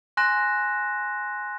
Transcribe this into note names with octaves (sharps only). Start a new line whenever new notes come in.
G#5 C6 F#6 A#6 E7